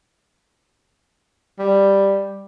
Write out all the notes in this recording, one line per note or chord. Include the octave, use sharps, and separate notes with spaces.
G3